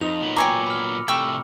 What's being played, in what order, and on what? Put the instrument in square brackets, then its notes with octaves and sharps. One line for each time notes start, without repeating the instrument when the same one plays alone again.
[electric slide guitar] F2 [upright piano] D#4 [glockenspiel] F7
[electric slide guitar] A#2 F#3 B3
[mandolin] G5 G#5 C#6 [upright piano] A#5 [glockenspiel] D6 E6 C#7
[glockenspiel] B5 F6
[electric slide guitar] A2 C3 A3 [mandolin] G5 C#6 E6